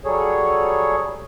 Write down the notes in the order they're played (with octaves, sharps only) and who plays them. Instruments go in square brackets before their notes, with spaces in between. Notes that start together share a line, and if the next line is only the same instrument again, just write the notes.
[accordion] F#3 G3 G#4 A4 C#5